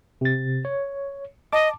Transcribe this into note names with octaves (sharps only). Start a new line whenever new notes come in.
C3 A6
C#5
D#5 A5 D6